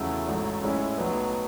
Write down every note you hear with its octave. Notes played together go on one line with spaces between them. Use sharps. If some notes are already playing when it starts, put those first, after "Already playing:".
Already playing: E2 C#3 F#3 A3 E4
A1 G#2 F#3 A3
A2 G#3 C#4 E4
B1 A2 F#3 B3 D#4